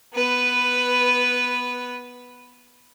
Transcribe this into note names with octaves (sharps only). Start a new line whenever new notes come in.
B3 B4